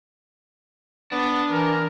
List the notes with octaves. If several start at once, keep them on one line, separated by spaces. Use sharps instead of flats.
B3 D4
E3 A#4